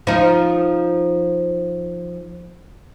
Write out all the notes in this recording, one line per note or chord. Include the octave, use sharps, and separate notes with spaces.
F3 D#4